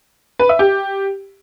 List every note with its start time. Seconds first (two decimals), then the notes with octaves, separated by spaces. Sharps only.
0.39 B4
0.49 E5
0.59 G4